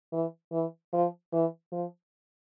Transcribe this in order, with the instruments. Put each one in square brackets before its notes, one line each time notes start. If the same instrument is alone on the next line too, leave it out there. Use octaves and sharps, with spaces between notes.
[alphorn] E3
E3
F3
E3
F3